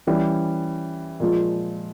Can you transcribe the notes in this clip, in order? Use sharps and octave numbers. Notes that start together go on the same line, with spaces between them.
E3 G3 C#4
A#2 F3 G#3